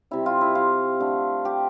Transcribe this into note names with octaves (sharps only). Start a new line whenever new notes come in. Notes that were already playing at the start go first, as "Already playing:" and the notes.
C3 G3 E4
F4
E4
F4
D3 A3
G4